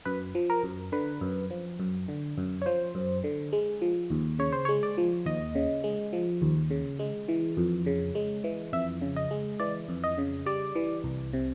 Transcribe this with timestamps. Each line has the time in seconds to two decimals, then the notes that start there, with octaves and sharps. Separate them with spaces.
0.05 F#2 B4
0.35 F3
0.50 A#4
0.64 F#2
0.92 D3 B4
1.21 F#2
1.51 F3
1.80 F#2
2.08 D3
2.38 F#2
2.62 C#5
2.66 F3 C5
2.95 F#2
3.24 D3
3.53 G#3
3.82 F3
4.10 D#2
4.39 C#3 C#5
4.52 C5
4.65 C#5
4.69 G#3
4.83 D5
4.98 F3
5.26 D#2 D#5
5.55 C#3
5.84 G#3
6.13 F3
6.42 D#2
6.71 C#3
6.99 G#3
7.28 E3
7.57 F2
7.86 C#3
8.15 G#3
8.44 E3
8.73 F2 E5
9.02 C#3
9.16 D#5
9.31 G#3
9.60 E3 D5
9.89 F2
10.04 D#5
10.18 C#3
10.46 G3 D5
10.75 E3
11.04 C2
11.33 C3